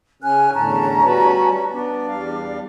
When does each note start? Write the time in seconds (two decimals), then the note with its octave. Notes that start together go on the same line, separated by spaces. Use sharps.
0.22 C#3 C#4 G#5 F6 F#6
0.53 E2 A2 D3 C#4 A5 A#5
1.04 G3 F#4 B4
1.71 B3 D4
2.08 E2 G3 F5